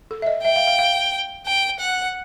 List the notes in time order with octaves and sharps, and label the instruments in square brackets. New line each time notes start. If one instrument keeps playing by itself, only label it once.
[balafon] A4
E5
D#5
[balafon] E5 [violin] G5
[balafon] F5
F5
F5
[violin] G5
F#5